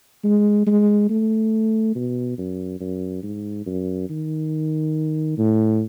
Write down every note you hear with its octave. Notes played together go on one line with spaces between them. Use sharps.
G#3
G#3
A3
B2
F#2
F#2
G#2
F#2
D#3
A2